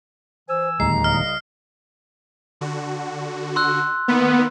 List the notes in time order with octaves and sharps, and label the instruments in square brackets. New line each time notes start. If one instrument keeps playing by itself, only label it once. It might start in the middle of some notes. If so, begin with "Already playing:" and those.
[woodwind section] E3 G#5 E6 [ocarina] C5
[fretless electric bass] D1 D#2 G#3 [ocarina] A#5 [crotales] C7
[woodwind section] C2 C#3 D#5 [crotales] F6
[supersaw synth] D3 F#4
[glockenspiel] C6 E6 F#6
[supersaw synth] D#3 A#3 [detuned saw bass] B3